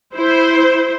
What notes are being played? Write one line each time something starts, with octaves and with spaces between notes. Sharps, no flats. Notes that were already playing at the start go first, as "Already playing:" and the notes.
E4 C5